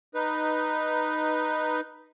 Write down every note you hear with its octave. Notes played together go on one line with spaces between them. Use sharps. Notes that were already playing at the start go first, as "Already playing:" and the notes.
D#4 B4